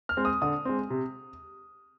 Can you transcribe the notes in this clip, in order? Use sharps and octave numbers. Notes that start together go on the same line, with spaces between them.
F6
G#3 C4
D#6
D3 D#6
G#3 C4
C3